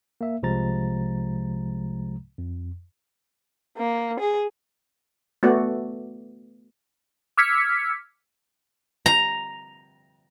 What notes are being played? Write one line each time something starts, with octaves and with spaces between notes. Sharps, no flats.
A#3 E5
C2 C3 F3 G#3 A#5 A6
F2
A#3
G#4
A3 B3 F#4 D5
D6 E6 F6 G#6 B6 C#7
A#5